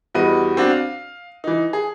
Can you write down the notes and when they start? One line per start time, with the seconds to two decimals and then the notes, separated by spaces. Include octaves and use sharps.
0.15 E2 G3 F#4 B4 D#5 D#7
0.57 C4 D4 F#4
0.70 F5
1.44 E3 D#4
1.73 G#4